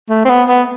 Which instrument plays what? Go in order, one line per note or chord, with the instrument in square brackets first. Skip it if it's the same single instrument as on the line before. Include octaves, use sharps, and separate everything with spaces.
[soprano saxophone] A3
C4
B3
B3